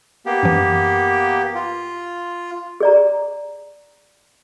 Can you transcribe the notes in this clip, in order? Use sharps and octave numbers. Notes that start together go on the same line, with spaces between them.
A#3 B3 G4
F#2 E3
F4
G#4 D5 A#5